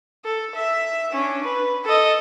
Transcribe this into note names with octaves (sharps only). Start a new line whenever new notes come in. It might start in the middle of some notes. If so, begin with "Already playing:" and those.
A4
E5
C#4 D4
B4
A4 D#5